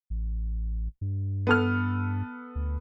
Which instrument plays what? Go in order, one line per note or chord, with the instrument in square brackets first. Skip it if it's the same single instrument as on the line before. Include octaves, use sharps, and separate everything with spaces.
[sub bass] A1
G2
[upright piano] B3 A4 F6
[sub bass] D2